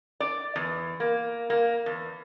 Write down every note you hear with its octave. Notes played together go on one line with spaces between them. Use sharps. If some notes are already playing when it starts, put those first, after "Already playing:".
D5
E2
A#3
A#3
E2